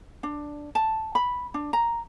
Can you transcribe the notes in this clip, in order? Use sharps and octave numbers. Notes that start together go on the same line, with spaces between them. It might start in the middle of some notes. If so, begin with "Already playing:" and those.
D4
A5
B5
D4
A#5